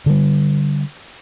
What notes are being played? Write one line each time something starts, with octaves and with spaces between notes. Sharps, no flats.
D3 G3